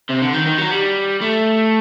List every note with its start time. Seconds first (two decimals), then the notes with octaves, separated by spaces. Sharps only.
0.09 C3
0.22 D3
0.33 D#3
0.46 D#3
0.58 F#3
0.71 G3
1.21 A3